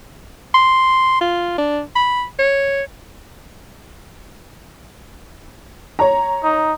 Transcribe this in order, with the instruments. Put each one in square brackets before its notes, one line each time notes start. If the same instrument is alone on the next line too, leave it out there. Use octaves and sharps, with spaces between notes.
[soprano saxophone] C6
F4
D4
B5
C#5
[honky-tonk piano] C#5 A#5
[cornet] D#4